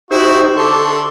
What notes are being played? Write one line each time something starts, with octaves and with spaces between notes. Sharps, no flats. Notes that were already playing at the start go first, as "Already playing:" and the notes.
D#4 E4 F#4 G4 C5
D3 A4 C6 C#6